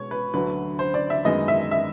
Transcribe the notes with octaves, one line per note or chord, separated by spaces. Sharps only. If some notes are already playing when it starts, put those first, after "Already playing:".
Already playing: B2 G#3 C#5
B4
D2 D3 F#3 B4
C5
D5
E5
F#2 D#3 G#3 B3 D#5
E5
E5